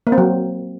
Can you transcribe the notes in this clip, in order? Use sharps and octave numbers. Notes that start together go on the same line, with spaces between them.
A#3
C4
F#3